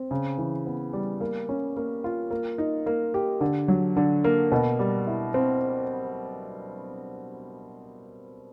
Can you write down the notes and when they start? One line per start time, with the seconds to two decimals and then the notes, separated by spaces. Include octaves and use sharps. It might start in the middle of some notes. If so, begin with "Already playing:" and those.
Already playing: C4
0.11 C#3
0.38 E3
0.66 B3
0.93 G3
1.21 A#3
1.49 C#4
1.77 A#3
2.04 F4
2.31 A#3
2.58 D#4
2.86 A#3
3.14 G4
3.41 D3
3.68 F#3
3.96 D3
4.24 A#3
4.52 B2
4.79 G3
5.07 E4
5.34 C4